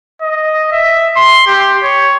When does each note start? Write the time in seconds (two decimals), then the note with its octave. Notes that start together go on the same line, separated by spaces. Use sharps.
0.22 D#5
0.72 E5
1.17 C6
1.47 G4
1.83 C#5